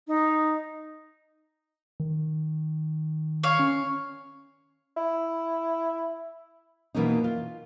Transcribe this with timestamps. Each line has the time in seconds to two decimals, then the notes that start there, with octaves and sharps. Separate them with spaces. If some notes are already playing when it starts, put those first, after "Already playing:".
0.08 D#4
2.00 D#3
3.43 C#5 F5
3.59 C#4
4.97 E4
6.95 B2 E3 A#3 C#4 D#4
7.24 F4